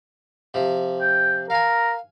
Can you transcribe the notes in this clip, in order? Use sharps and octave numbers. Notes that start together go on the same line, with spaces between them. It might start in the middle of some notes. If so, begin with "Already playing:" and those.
C3 F3
G5
A#4 F5 G#5